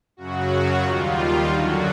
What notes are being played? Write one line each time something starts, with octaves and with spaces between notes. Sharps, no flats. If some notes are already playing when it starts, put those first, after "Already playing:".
F#2 C#3 F#3 F#4
D#2 D#3 G3 F4
F#2 D3 F#3 F#4